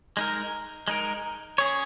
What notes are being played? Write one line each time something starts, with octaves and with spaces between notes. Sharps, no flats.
G#3 D#4 A#4
G#3 D#4 A#4
C#4 G#4 C#5